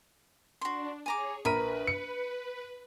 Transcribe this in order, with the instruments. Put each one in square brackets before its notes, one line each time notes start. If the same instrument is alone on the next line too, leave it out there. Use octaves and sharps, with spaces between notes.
[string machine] D4 [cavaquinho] F#4 C6
[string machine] G#4 C#5 [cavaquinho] G#5 A#5 D6
[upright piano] A#1 A#4 D#7 [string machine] B4 [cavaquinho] B5
[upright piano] C#7